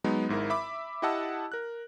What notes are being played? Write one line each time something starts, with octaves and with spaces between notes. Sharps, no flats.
F#3 G#3 B3 D#4
G#1 G#2 E4 A#4
E5 B5 D6
E4 G4 D#5 F#5 A5 E6
A#4 F#6